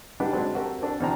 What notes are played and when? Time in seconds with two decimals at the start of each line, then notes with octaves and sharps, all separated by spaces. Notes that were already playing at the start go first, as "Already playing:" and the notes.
0.20 G3 D4 D#4 B4 F#5
0.33 F#3 G#3 C4 D4
0.54 C4 F#4 G4 A4 A#4
0.82 C4 D4 A4
1.00 E2 B2 C4 D4 G5 A#5